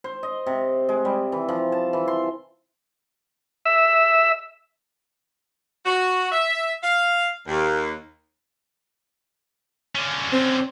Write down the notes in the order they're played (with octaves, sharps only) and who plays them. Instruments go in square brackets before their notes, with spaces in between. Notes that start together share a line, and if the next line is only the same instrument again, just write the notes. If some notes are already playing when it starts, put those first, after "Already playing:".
[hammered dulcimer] C5
D#5
C3
G#3
G3
E3
F3
A5
E3
C6
[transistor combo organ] E5
[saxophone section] F#4
E5
F5
D#2
[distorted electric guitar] D3 C#4
[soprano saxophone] C4